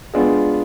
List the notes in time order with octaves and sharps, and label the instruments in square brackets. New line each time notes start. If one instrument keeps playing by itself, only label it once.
[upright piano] G#3 B3 D4 F4 G#4